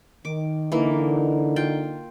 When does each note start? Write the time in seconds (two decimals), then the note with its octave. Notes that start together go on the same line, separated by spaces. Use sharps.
0.25 D#3 D6
0.72 D3 E3 A#3 D#4
1.56 F4 G5